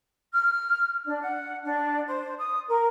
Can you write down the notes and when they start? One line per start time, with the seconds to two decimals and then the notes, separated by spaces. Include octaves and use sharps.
0.31 F6
1.04 D4
1.20 F#5
1.62 D4
2.05 C5
2.37 D#6
2.66 A#4